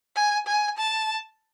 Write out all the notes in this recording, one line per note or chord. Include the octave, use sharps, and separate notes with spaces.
G#5
G#5
A5